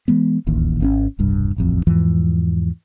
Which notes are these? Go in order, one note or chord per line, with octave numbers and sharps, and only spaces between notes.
E3 G#3 B3
D1 A1 D#2
G#1 C4 C#4
E1 C2 G2
D#1 A1 F2
E2 G#2 E3 F3